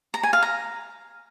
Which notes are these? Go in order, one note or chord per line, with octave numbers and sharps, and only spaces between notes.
A#5
G#5
F5
A#5